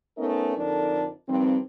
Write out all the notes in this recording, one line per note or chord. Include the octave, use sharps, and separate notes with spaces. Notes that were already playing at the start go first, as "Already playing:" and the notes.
A3 B3 C#4 D#4 A#4 D#5
F2 D3 D4 D#4 A4 A#4
G2 D#3 F3 C4